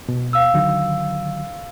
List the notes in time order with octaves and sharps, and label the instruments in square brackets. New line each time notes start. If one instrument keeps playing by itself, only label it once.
[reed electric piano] B2
[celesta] F5 E6
[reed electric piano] D3 D#3 F#3